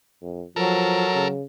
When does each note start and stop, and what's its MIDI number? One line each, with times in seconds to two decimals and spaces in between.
0.22 0.44 41
0.56 1.05 53
0.56 1.34 54
0.56 1.28 69
0.56 1.28 70
1.15 1.43 49